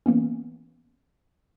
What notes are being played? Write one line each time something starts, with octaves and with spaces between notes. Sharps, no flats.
E3 A#3 B3 C#4